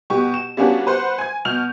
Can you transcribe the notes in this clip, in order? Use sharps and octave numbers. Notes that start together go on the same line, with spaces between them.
B2 G4 C#6
E7
G3 A#3 B3 C#4 D4 F#4
B4 C5 F#5 C6
G#5 G#6
B2 F6 G6 F7